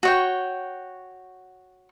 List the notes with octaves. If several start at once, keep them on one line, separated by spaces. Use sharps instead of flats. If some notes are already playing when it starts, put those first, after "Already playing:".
F#4 C#5 G5